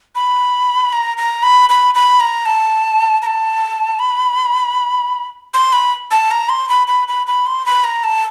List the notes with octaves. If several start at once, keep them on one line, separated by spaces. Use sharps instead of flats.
B5
A#5
A#5
B5
B5
B5
A#5
A5
A#5
A5
B5
C6
B5
A5
A#5
C6
B5
B5
B5
B5
C6
B5
A#5
A5